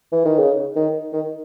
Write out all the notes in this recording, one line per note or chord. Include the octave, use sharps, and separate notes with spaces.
E3
D#3
C#3
D#3
D#3